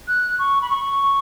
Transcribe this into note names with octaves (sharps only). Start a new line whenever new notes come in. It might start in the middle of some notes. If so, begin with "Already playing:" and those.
F#6
C#6
B5
C#6